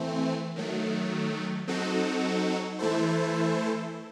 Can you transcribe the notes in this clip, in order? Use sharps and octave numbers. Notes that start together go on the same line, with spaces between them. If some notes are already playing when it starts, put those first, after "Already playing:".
Already playing: E3 A3 C4
D#3 F#3 A3
F#3 C4 D#4 F#4 A4
E3 A3 E4 A4 C5